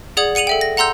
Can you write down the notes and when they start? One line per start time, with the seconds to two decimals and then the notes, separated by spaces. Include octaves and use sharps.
0.17 G#4 D5 F#5 D#6 G#6 F#7
0.35 F#5 C#7 D#7 F7 F#7
0.47 A4 E5 G5
0.61 A#6
0.77 F#5 A#5 C6 E6 G6